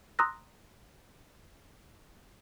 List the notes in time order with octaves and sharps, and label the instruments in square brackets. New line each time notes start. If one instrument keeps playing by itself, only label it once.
[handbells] A#5 C6 D#6 E6 F#6 A#6